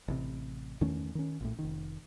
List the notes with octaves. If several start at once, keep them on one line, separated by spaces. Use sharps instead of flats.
A1 C3
E2 D#3 A3 C#4
D#3 C#4
A#1 A2
F1 D#3